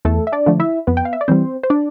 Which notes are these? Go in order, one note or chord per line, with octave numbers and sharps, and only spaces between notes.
E2 A3 A4
E5
D4 D5
D3 F3 A3
E4 E5
F2 B3 B4
G5
F5
E5
D5
E3 G3 C4 C5
C5
D4 D5